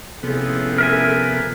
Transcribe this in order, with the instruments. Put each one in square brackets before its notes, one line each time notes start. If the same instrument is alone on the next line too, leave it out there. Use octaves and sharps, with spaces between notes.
[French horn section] A2 C#4 G#4 [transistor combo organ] C3 F3 B3 [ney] A4
[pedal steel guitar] A#4 E5 G#5